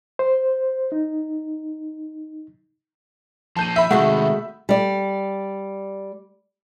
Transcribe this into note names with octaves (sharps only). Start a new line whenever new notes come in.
C5
D#4
F3 A#3 A5 G6 D#7
E5 B5
C3 D#3 G#3 A3 F#4 F#5
G3 D5